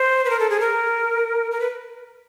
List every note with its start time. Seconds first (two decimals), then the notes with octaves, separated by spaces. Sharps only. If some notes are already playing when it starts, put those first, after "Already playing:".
Already playing: C5
0.25 B4
0.30 A#4
0.39 A4
0.50 G#4
0.60 A#4
1.51 A#4
1.60 B4